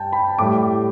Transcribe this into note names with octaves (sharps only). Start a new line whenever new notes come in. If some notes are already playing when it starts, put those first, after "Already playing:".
Already playing: G2 G3 G5 A5
B5
A2 G3 D6